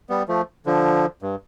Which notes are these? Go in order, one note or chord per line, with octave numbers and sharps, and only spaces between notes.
G3 B3
F3 A3
D3 F3
G2